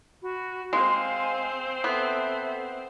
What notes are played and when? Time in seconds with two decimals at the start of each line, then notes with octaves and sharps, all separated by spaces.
0.23 F#4 B5
0.73 G#3 C4 C5 F5 G#5
1.84 B3 A4 E5